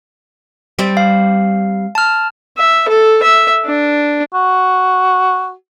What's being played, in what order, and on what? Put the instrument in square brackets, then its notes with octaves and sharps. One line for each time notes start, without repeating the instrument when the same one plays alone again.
[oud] G3 C4
[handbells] F5
A5 F6
[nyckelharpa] E5
A4
E5
D4
[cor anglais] F#4